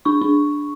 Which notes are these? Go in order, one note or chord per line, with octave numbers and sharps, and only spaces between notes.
D4 C#6
D4